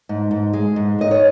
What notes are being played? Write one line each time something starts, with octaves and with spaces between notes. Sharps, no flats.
G#2
G#2
G#3
G#2
G#2 D#5
C#5